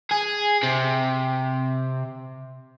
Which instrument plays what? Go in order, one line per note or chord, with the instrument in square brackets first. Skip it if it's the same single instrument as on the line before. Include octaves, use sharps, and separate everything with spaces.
[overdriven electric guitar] G#4
C3